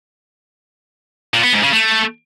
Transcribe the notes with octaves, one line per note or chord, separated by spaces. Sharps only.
A#2
B3
G#2
C#3
A3